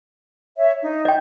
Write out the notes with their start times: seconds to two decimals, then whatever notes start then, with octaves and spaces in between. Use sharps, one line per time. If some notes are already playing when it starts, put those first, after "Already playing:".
0.57 C#5 E5
0.82 D#4
1.05 D#5 G5 G6